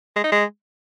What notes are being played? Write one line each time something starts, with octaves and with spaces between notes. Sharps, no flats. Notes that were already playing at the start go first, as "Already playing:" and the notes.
G#3
D#4
G#3